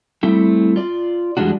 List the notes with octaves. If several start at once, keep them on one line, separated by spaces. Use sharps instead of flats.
G3 A3 C4 E4
F4 D5
E2 G3 G#3 D4 F#4